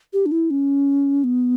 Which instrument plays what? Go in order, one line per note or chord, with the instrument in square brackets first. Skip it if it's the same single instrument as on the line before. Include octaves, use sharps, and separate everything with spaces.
[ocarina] G4
D4
E4
C#4
B3